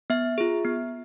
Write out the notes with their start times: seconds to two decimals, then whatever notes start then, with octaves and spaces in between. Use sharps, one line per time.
0.10 B3 E5
0.38 F4 G#4
0.65 B3